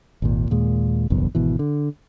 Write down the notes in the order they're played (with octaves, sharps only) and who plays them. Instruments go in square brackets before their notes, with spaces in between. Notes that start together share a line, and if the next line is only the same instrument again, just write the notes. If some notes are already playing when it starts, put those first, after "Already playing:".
[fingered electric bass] G#1 D#2 A#2
D#2 A#2 G#3
F#1 B1 E2 G2
G#1 B2 E3
D3